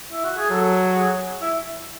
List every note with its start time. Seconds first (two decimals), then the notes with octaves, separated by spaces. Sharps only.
0.12 E4
0.24 F#4
0.37 G#4
0.50 F#3 A4
0.95 G#4
1.42 E4